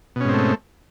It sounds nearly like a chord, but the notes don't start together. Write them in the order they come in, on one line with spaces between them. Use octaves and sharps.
B2 C#4 G#2 C4 A3